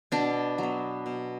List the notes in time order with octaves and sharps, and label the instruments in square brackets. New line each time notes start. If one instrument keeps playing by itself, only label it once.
[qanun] B2 D4
F#3 B3
B2